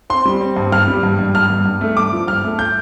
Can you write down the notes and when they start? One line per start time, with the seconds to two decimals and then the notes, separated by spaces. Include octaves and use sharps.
0.10 C4 C6
0.25 G3
0.41 C4
0.57 G2
0.72 G2 F6
0.88 G3
1.03 G2
1.19 G2
1.34 G2 F6
1.50 G2
1.66 G2
1.81 A3
1.97 G2 D6
2.12 F3
2.28 G2 F6
2.44 A3
2.59 G6